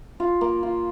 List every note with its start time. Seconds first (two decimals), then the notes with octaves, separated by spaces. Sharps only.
0.20 F4
0.41 A#3
0.63 F4